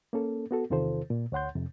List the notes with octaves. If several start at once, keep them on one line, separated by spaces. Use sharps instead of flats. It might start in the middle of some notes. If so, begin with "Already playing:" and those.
A#3 C#4 A4
B3 F#4 A4
E2 C3 D#3 F4 A4 C5
A#2
D2 C#5 F#5 C6 G6
F2 C3